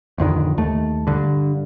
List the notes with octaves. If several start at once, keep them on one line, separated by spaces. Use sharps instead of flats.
A1 F2 D3 D#3
D#2 A3
G2 D3